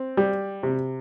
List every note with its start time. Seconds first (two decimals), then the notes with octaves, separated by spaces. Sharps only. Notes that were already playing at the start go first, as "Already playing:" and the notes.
Already playing: C4
0.17 G3
0.63 C3